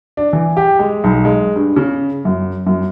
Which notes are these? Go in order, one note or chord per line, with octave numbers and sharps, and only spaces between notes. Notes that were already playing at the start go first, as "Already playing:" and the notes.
D4
E3
G4
G#3
B1
G#3
G2
C#3
F#2
F#2